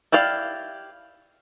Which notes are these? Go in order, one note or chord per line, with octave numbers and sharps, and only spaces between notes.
E4 G4 D5 F5